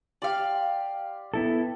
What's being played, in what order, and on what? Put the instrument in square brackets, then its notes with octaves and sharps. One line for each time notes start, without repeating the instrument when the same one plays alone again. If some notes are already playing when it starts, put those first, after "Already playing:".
[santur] G4 C6 [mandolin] D5 F5
[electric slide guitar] B3 E4 A4